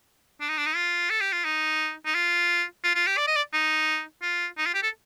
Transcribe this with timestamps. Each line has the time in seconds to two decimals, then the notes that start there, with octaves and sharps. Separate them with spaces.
0.40 D4
0.49 D#4
0.58 D4
0.66 D#4
0.75 F4
1.10 A4
1.21 G4
1.33 F4
1.44 D#4
2.06 D#4
2.14 F4
2.84 F4
2.95 F4
3.07 G4
3.17 D5
3.27 D#5
3.36 D5
3.53 D#4
4.22 F4
4.58 D#4
4.66 F4
4.74 G4
4.83 A4